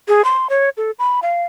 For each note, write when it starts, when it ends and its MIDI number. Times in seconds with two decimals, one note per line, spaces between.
0.08 0.24 68
0.24 0.47 84
0.49 0.69 73
0.77 0.91 69
0.99 1.20 83
1.22 1.46 77